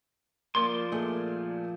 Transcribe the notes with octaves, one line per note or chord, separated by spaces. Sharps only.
F3 A#3 D5 C6
A#2 A3 G#4